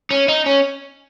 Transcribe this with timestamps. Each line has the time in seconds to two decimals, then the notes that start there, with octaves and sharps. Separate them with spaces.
0.11 C#4
0.28 D#4
0.46 C#4